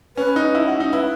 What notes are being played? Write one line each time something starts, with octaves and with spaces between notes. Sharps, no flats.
C#4 B4
D#4
E4
F#4
D#4
E4 B4